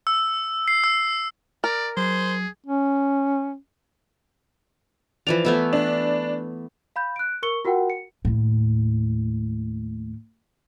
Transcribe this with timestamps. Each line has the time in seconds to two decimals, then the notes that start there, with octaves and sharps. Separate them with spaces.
0.07 E6
0.68 C7
0.84 E6
1.64 A#4 D5
1.97 F#3 G#4 C5
2.66 C#4
5.27 E3 F3 D5 F7
5.45 A3 B3 E4
5.73 D4
6.96 F5 B5 G6
7.16 F#6 D7
7.43 A#4 C#6 C#7 G7
7.65 F4 F#4 A#4 F#5 G5
7.90 C#7
8.25 D#2 A2